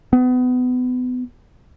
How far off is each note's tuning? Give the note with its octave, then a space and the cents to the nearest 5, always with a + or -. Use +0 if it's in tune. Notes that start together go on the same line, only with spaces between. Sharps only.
B3 +30